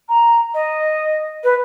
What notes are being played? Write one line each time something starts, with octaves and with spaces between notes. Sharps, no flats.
A#5
D#5
B4